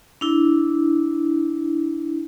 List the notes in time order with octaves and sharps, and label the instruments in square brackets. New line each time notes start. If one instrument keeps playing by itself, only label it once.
[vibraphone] D4 E4